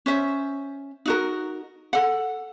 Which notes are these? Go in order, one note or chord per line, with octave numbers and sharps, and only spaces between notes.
C#4 C5 E5
D#4 F#4 A#4
A4 F#5